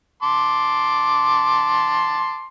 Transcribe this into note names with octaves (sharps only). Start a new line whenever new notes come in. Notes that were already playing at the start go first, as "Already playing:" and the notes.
A5 C6 D6